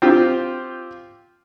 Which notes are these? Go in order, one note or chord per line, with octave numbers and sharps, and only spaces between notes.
C4 F4 G4